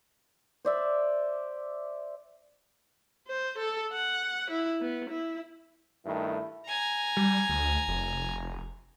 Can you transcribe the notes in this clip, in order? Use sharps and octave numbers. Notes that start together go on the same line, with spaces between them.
C5 D5 E5
C5
A4
F#5
E4
B3
E4
G2 D#3 A3 E4
G#5 A#5
G3
D2
F1